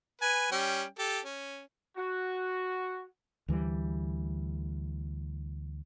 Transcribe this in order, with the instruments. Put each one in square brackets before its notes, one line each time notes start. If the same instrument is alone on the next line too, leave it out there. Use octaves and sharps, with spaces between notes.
[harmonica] B4 G#5
G3 C#4 G5
G4 A4
C#4
[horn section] F#4
[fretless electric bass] D2 E3 F#3 G3